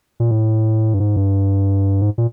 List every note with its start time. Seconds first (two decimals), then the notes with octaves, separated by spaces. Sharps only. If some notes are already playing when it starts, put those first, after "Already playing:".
0.20 A#2
0.31 A2
0.94 G2
1.00 G#2
1.16 G2
2.01 G#2
2.18 A#2